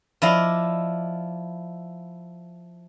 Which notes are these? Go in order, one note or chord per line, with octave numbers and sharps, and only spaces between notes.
F3 E4 D5 D#5 F5